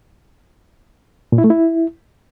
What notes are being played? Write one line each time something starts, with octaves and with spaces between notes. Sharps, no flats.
A#2
E4
A3
E4